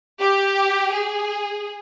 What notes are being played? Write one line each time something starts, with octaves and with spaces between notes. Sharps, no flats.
G4
G#4